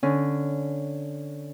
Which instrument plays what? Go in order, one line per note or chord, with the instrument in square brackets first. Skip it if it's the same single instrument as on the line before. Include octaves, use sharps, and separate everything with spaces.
[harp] D3 C#4